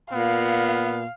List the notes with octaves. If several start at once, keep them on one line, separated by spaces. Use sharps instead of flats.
A#2 B3 F5